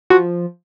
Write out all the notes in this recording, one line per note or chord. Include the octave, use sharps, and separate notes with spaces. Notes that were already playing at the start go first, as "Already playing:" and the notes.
F3 F#4